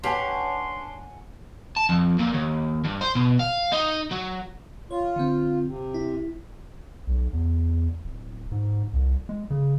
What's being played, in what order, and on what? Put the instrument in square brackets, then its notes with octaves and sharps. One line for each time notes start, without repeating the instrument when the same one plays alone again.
[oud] C#4 G4 B4 [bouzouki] D4 [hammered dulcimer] C#5 F#5 G#5 [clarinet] C6
[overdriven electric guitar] A5
F2
A#2
D#2
G2
C5
B2
F5
D#4
F#3
[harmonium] F4 [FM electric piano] C#5
[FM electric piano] D3 C4
[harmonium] C3
[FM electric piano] E4
[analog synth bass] B1
E2
D1
G#2
C2
G#3
C#3